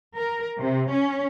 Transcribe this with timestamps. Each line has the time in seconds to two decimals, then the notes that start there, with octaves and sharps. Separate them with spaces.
0.15 A#4
0.57 C3
0.91 C#4